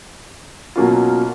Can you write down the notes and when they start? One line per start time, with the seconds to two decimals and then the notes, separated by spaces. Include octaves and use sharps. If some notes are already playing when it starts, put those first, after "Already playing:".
0.76 B2 F#3 A#3 C#4 F4